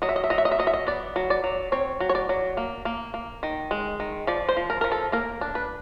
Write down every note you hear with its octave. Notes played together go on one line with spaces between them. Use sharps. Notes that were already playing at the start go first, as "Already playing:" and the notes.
F#3 D#5
E5
D#5
E5
F#3 D#5
E5
D#5
E5
F#3 D#5
E5
D#5
B3 D5
F#3
D5
F#3
C4 C#5
F#3
C#5
D5
F#3
A#3
A#3
A#3
D#3
G#3
D#3
F3 D5
C5
F3
A#4
F3 A#4
A4
A#3 A#4
D4
B4